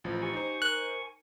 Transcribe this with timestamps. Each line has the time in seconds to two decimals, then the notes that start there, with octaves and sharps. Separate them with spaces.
0.04 A1 F3
0.22 G4 G#5 C#6
0.33 D#4 C5
0.62 A#4 F#6